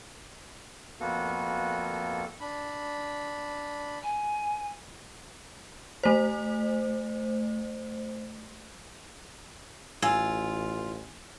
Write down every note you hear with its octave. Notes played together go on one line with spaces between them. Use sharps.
F2 A#3 B3 F#4 A4
D4 B5
G#5
A3 C5
A1 F4 G#5 E6 G#6